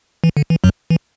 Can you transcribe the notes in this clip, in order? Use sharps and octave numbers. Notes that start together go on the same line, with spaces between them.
E3
D3
E3
F#2 F#3
E3